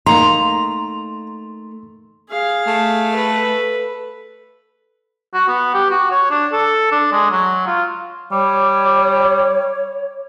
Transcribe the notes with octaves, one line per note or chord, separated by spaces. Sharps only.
A3 A#3 D#4 A#5 C6
G#4 F5
A3
A4 B4
F#4
B3
G4
F#4
C#5
D4
A4
D4
G#3
F#3
F4
G3 C#5 D6